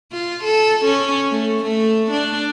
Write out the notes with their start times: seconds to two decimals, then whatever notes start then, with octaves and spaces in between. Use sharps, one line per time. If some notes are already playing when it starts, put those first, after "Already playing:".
0.11 F4
0.44 A4
0.85 C#4
1.30 A3
1.63 A3
2.11 D4